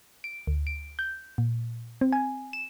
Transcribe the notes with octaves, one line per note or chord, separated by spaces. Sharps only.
D7
D2
D7
G6
A#2
C4
G#5
E7